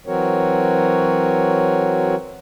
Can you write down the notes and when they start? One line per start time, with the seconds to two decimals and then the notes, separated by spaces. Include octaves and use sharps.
0.07 E3 F#3 C4 F#4 A#4 C#5